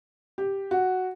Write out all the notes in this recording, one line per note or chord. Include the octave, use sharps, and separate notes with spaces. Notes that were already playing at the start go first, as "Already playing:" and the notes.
G4
F#4